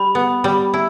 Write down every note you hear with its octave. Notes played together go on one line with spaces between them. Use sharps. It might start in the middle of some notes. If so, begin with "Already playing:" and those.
Already playing: G3 B5
B3
G3
E4